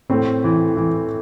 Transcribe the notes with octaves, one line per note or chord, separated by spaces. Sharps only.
A2 A3 C4
E3
E3